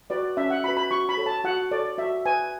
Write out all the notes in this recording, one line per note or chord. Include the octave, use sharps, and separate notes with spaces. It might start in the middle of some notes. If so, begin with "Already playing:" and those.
F#4 B4 D5
C#4 E5
F#5
F#4 B4 B5
B5
F#4 C#6
B5
A4 C#5
A5
F#4 F#5
A4 C#5 D5
F#4 E5
B4 G#5